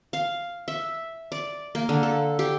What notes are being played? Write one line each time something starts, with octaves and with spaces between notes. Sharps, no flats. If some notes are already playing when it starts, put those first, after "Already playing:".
F5
E5
D5
A#3
D3
A4
G4